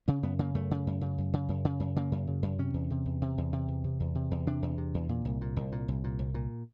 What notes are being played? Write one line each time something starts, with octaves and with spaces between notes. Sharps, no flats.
C#3 C#4
F#2 B3
C#3 A#3
F#2 A3
C#3
F#2
C#3
F#2
C#3
F#2
C#3
F#2
C#3 A#3
F#2
C#3
F#2
C3 C#4
E2
C3
E2
C3
E2
C3
E2
C3
E2
C3
E2
C3 D4
E2
C3
E2
A#2
C2
A#2
C2
A#2
C2
A#2
C2
A#2